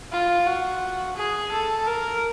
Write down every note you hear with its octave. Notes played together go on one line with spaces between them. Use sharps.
F4
F#4
G#4
A4
A#4